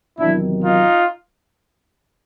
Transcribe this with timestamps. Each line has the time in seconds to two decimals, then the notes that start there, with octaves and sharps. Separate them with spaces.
0.18 E2 C3 D#3 F#3 D4 E4
0.63 D#4 F4